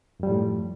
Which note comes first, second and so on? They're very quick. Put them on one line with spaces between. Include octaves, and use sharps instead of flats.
F#2 G3 F3 A2